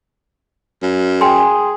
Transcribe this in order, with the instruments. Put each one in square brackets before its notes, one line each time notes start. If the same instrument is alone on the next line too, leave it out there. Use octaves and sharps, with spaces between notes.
[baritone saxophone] F#2
[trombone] G#4 [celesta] G5 G#5 C6